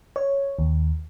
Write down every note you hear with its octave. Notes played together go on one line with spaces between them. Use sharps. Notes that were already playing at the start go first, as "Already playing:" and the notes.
C#5
D#2